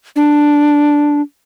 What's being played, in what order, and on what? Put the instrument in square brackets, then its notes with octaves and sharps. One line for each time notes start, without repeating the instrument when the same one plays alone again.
[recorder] D4